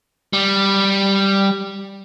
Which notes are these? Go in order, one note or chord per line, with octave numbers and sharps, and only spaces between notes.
G3